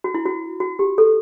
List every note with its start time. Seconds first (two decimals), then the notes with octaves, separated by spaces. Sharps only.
0.04 F#4
0.14 E4
0.26 F#4
0.60 F#4
0.79 G4
0.98 A4